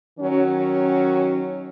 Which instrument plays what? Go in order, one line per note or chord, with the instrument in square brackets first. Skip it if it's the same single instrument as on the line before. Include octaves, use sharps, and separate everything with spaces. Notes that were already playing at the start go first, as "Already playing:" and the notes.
[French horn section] D#3 F#3 C#4